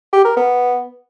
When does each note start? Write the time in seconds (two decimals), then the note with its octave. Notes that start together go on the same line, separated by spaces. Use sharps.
0.13 G4
0.25 A#4
0.37 B3